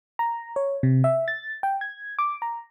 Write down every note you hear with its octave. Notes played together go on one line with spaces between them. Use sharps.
A#5
C#5
C3
E5
A6
G5
G#6
D6
A#5